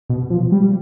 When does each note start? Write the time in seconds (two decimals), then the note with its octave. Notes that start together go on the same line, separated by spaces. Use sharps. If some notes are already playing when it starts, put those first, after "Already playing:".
0.10 B2
0.30 F3
0.52 G3